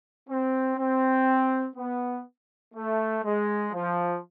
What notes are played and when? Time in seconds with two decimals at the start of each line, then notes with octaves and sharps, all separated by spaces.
0.29 C4
0.78 C4
1.76 B3
2.74 A3
3.24 G#3
3.73 F3